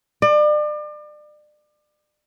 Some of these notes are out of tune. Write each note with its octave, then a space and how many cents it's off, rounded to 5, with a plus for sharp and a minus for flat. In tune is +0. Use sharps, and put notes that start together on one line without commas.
D5 +35